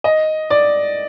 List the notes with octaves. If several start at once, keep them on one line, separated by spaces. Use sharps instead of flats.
D#5
D5